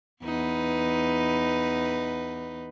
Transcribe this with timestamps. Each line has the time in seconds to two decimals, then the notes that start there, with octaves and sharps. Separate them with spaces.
0.23 E2 D#4 B4